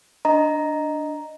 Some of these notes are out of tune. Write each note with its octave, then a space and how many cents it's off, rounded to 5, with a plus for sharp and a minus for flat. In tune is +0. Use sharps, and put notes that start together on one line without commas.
D4 +0 D#5 +0 A#5 +0